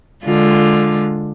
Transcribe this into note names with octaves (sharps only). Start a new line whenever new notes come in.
D3 G#3 F4